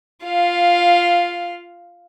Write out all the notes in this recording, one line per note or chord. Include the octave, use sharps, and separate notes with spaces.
F4 F5